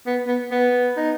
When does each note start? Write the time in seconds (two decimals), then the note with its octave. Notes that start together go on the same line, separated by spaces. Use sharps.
0.07 B3
0.27 B3
0.51 B3
0.97 D#4